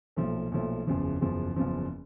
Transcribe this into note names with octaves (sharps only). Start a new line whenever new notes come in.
B1 A#2 F3 A3
B1 A#2 F3 A3
F#1 E2 C#3 F3
F#1 E2 C#3 F3
F#1 E2 C#3 F3